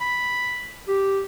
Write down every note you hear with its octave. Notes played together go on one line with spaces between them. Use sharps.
B5
G4